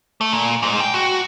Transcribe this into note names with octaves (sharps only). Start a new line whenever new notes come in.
A3
A#2
G#2
G5
F#4